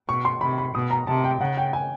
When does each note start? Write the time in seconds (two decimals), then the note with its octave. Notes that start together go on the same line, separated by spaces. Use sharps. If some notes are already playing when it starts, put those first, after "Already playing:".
0.08 B2 C#6
0.25 C6
0.41 C3 B5
0.58 B5
0.75 B2 D#6
0.91 A#5
1.07 C3 A5
1.24 G5
1.41 C#3 F#5
1.57 G5
1.73 G#5